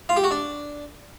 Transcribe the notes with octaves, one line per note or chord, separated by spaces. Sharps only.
F4
G4
F#4
D4